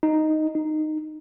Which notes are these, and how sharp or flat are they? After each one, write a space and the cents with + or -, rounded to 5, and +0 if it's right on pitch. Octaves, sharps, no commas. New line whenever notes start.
D#4 +0
D#4 -10